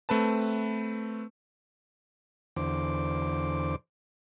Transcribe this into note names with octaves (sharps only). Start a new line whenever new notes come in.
A3 C4 B4 A5
E2 D3 C5 D6